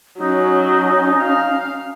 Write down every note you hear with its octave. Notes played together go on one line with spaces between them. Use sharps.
F#3 C#4 D#4
F5